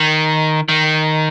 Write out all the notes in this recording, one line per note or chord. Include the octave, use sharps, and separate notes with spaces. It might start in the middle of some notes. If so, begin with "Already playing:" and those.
Already playing: D#3
D#3